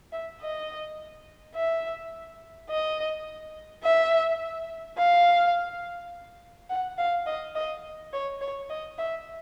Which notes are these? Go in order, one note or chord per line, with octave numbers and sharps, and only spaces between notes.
E5
D#5
E5
D#5
E5
F5
F#5
F5
D#5
D#5
C#5
C#5
D#5
E5